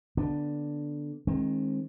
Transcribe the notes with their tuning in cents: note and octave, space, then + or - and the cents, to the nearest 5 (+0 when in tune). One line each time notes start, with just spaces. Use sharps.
D3 +0 B3 +0 D4 +0
D#3 +0 G#3 +0 C4 +40